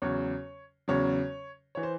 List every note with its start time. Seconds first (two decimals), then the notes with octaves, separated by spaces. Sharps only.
0.02 E2 C#3 F#3 C#5
0.88 E2 C#3 F#3 C#5
1.75 E3 C#5
1.83 C5